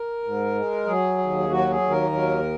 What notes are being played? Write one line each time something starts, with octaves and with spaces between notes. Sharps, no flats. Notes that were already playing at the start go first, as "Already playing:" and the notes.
Already playing: A#4
G#2
G#3
F#3 G#4
D#2
F#3 F#4
G#4
D#2
A#4
F#3